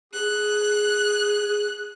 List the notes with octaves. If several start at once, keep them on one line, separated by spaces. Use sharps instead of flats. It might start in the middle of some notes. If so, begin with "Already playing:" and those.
G#4 F#6